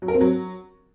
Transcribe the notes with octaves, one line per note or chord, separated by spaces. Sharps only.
F#3
A#4
C4
F#3